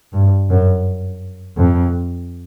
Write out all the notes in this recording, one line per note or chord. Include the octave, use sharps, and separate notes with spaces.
G2
F#2
F2